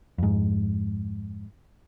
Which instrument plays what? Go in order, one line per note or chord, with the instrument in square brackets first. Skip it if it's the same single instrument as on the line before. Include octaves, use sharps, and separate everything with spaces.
[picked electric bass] F2 G#2